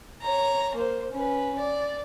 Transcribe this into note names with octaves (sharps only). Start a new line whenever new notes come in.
C#5 A#5
A#3 C5
C#4 B4
D5